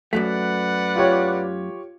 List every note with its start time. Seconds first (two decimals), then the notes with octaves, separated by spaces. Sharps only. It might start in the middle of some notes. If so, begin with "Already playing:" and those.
0.13 F#2 F#3 A3 B4 D5 F#5 B6
0.95 F4 G4 C#5